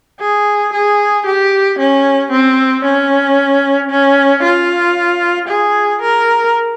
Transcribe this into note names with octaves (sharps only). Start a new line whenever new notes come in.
G#4
G#4
G4
C#4
C4
C#4
C#4
F4
G#4
A#4